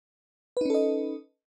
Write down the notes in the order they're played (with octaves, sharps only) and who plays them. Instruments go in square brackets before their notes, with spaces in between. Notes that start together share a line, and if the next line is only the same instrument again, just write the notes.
[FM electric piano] B4
D#4
C#4
A4
D#5